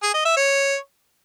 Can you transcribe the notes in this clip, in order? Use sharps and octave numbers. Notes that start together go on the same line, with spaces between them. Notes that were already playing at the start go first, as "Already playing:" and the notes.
G#4
D#5
E5
C#5